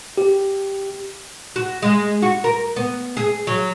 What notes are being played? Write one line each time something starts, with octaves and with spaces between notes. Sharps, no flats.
G4
F#4
G#3
F#4
A#4
B3
G#4
F#3